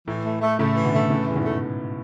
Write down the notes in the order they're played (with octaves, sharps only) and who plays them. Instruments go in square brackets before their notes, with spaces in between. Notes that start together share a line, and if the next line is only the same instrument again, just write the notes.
[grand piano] A2 [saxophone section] E3
[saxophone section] A3
A3
[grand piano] A2 C#3 [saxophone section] A3
[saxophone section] E3
[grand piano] B2 D3
[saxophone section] A3
[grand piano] A2 C#3 [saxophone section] E3
[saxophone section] E2
[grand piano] G#2 B2
[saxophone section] A3